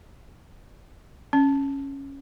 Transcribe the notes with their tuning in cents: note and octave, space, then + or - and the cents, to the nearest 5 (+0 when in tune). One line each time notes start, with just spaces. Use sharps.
C#4 -5